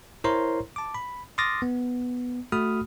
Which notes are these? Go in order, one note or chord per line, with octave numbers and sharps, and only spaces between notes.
E4 A#4 C5 C#5 A#5 C6
A5 D6
B5
C6 D6 D#6 F6 A6 A#6
B3
A3 F#4 B5 D#6 F6